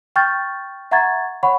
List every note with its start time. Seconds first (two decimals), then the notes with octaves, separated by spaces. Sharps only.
0.16 G5 C#6 F6 G6 A6
0.91 E5 F#5 A#5 C#6 G#6 A6
1.43 C#5 F#5 B5 C#6